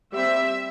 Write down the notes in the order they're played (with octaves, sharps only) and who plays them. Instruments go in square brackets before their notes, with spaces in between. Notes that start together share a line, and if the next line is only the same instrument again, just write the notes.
[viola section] G3 C4 E5